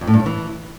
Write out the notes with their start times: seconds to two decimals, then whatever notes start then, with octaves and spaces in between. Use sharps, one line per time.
0.01 F2
0.07 A2
0.14 G2
0.20 A2
0.26 E3